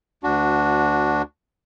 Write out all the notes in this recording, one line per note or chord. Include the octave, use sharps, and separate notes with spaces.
D2 D4 F#4